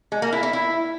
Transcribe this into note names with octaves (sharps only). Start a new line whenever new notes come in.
G#3
A#3
E4
E4
E4